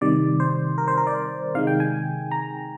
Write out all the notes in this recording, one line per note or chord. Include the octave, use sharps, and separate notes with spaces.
C3 D#3 G3 D5
C5
A#4
C5
A#4
D5
C3 D#3 G#3 F5
G5
G#5
A#5